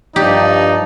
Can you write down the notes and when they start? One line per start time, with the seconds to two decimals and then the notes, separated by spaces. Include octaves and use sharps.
0.16 G2 F3 D#4 G4 D5